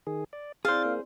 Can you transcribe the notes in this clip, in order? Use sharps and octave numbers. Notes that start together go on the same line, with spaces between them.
D#3 G#4
D5
C4 E4 G#4 C5 D5 F5 A6
A#3